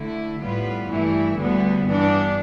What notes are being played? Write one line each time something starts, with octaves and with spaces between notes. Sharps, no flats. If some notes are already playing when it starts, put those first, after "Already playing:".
Already playing: D3 A3 E4
A2 G3 B3 F4 B4
G2 E3 A3 E4
D2 D3 G3 B3
G2 E3 B3 D4